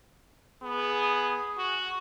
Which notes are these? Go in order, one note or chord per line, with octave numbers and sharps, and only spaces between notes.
B3 G#4
F#4